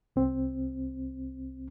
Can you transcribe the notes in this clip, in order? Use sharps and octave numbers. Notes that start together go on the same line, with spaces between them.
C2 C4